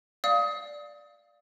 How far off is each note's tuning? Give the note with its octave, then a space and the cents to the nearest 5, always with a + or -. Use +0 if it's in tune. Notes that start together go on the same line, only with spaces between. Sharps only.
D5 +0 F5 -5 D#6 +25